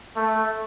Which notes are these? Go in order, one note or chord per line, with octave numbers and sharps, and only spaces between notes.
A3